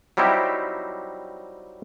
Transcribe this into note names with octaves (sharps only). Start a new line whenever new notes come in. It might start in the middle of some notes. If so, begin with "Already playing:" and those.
F#3 G3 C4 D#4 E4 G4